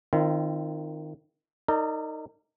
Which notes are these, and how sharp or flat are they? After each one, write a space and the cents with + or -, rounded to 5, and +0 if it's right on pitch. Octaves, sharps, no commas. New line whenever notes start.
D#3 -10 C4 +0 F4 -40
D#4 +0 A#4 -35 D5 +0